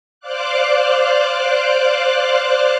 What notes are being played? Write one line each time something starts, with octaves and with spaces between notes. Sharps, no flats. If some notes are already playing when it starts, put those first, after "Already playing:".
C5 D5 F5 D6 F#6